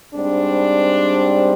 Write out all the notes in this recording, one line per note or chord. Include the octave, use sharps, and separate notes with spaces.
G#2 G3 C4 D4